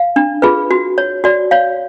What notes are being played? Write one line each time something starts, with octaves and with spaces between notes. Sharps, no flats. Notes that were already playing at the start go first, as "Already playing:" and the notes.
Already playing: F5
D4
F4 G#4 B4
F#4
C#5
F#4 D5
C#5 F5